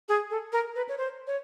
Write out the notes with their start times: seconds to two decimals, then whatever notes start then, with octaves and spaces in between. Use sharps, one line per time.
0.09 G#4
0.30 A4
0.53 A#4
0.76 B4
0.89 C#5
0.98 C5
1.27 C#5